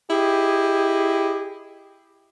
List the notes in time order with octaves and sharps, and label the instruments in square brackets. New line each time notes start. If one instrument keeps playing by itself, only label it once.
[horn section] E4 G4 G#4 D#5